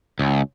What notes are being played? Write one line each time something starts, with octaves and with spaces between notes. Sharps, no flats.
C#2